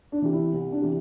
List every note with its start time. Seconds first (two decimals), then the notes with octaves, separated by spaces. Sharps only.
0.12 D4
0.22 C3 E3
0.33 E4
0.53 C2
0.72 D4
0.82 C3 E3